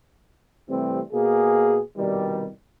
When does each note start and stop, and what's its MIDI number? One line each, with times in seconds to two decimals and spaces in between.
0.69 1.00 48
0.69 1.00 52
0.69 1.00 55
0.69 1.00 57
0.69 1.00 60
1.13 1.79 47
1.13 1.79 58
1.13 1.79 68
1.97 2.47 36
1.97 2.47 47
1.97 2.47 51
1.97 2.47 55